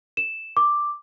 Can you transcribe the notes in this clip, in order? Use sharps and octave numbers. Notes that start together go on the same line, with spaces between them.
E7
D6